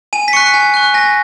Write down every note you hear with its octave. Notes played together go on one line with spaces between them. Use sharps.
G#5 D#7
B6
C#6 F#6 C#7
G#5
C#6 F#6
G#5 A#6